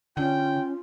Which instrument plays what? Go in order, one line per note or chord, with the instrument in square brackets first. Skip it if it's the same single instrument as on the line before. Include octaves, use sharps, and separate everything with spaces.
[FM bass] D3 [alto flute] C#4 [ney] F4 [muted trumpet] G5